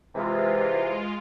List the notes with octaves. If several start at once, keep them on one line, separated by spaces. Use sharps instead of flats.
C3 E3 G#3 F4